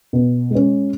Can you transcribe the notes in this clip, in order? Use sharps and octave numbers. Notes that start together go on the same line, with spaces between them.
B2
G#3 C#4